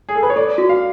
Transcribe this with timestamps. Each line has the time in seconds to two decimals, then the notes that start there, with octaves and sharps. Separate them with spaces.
0.09 G#4
0.15 A4
0.23 B4
0.30 C#5
0.36 A4 D5
0.58 F#4
0.69 F5